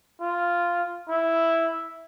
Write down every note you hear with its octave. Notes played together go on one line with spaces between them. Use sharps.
F4
E4